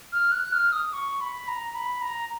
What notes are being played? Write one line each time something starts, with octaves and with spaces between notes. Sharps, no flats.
F6
F#6
F6
D#6
C#6
B5
A#5
B5
A#5